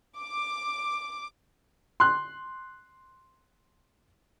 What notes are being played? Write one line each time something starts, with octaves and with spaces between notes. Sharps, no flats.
D6
C6 F#6